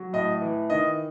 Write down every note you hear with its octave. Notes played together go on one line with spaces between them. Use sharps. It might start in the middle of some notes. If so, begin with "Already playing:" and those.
Already playing: F#3
A2 D#5
E3
D#3 D#5